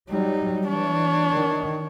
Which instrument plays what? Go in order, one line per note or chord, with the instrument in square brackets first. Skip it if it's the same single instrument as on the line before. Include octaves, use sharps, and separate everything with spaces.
[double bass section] F#3 G3 [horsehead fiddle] D#4
[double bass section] E3 [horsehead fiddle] D4 C#5
[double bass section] D#3